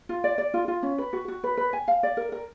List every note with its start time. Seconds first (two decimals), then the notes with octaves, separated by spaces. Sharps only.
0.09 F4
0.24 D5
0.38 D5
0.54 F4
0.68 F4
0.83 C#4
0.98 B4
1.13 F#4
1.28 F#4
1.44 B4
1.57 B4
1.73 G#5
1.88 F5
2.03 D5
2.17 A#4
2.32 A#4